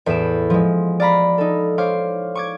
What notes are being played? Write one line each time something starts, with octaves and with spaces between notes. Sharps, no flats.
E2 A2 E4 G#4 D7 E7
F3 G#3
D5 F5 A#5 B5
D#4 A4
C5 C#5 F5 D6
C#6 D6 G#6